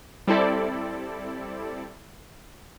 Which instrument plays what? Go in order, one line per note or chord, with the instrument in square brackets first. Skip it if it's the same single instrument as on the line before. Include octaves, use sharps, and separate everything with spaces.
[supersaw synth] G3 C4 E4 A4 D5